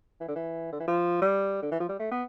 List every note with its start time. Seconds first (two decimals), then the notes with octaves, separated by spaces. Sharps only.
0.20 E3
0.28 D3
0.35 E3
0.72 D3
0.80 E3
0.87 F3
1.21 G3
1.62 D3
1.71 E3
1.80 F3
1.89 G3
1.99 A3
2.11 B3